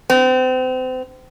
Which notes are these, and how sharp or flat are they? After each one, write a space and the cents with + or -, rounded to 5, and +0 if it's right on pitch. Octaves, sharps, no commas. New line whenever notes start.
C4 -35